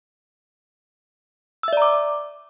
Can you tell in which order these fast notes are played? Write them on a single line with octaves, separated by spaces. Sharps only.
E6 E5 D5 A#5 D6